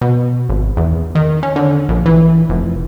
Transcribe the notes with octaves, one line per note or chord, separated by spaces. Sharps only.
B2
G#1
E2
D#3
C#4
D3
A#1
E3
F1